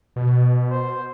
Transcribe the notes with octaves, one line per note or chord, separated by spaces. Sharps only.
B2
C5